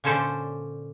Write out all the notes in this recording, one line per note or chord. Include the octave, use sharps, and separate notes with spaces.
A#2 D3 C#4 A4 C5 D5